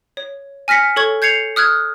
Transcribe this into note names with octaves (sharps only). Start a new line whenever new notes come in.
C#5
G#5 F6 A#6 B6 C#7
A4 C#5 C#6 G#6
G6 G#6 C7 C#7 F7
D#6 F6 F#6 G#6